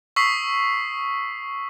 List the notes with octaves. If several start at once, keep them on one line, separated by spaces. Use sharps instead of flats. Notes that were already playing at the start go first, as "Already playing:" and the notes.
C#6 D#6 E6 B6 C7